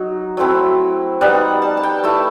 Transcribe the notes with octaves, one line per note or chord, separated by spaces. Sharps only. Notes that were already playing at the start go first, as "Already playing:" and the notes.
Already playing: F#3 D#4
F#3 A3 C4 E4
G3 B3 D#4 F#5
A5
A5
G5
A3 E4 A5